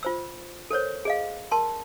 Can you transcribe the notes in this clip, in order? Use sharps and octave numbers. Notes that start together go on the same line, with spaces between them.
F4 C5 E6
A4 A#4 C5 C#5
G#4 D#5 F5
A#4 A5 C6